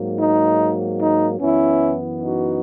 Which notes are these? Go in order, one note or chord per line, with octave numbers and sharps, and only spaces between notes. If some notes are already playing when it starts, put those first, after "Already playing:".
Already playing: G#2 F#3 A#3
D#4
D#4
F#2 E3 B3 C#4 E4
D#4 F#4